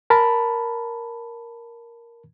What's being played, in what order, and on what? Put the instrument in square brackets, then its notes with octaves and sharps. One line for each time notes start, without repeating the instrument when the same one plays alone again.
[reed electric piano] A#4 A5 B5